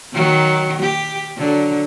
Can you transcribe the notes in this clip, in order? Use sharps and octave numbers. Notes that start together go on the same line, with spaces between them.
D#3 F#3
G4
D3 F#3